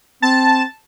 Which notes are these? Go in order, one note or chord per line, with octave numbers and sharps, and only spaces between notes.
C4 A5